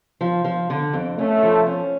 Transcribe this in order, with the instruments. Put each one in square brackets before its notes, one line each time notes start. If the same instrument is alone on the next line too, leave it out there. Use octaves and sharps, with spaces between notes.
[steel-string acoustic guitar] F3
F3
D3
F2
[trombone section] A3 [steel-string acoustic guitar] C#4
[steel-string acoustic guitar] F3
C#4